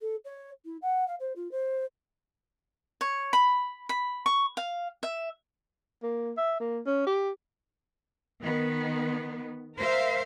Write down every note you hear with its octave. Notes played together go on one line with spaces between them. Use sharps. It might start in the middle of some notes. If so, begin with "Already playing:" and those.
A4
C#5
E4
F#5
F5
C5
F4
C5
C#5
B5
B5
C#6
F5
E5
A#3
E5
A#3
C#4
G4
D#3 B3
A#4 C5 E5 F5